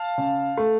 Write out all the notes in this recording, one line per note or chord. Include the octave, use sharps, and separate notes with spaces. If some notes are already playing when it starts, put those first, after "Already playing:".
Already playing: F5 A5
C#3
A3